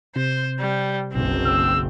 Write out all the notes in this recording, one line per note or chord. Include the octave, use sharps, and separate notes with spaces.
C3 C5
G3
F#1 B1 C4
E6